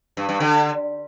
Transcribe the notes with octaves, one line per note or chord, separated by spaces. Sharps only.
G2
G2
D3